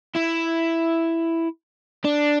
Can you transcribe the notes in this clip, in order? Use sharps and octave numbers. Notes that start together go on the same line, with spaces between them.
E4
D4